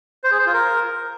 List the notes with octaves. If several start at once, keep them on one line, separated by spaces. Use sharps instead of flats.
C5
G#4
C5
F4
A#4